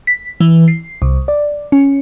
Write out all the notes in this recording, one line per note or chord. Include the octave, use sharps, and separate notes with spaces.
B6
E3
C7
C2
D5
C#4